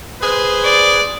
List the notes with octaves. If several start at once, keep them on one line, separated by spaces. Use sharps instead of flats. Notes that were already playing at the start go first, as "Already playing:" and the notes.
G#4 B4 C5
D5